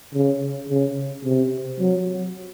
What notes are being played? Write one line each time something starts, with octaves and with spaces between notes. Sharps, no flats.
C#3
C#3
C3
F#3